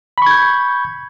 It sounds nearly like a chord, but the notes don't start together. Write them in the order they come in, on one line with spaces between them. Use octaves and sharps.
B5 C#6 G#6 G6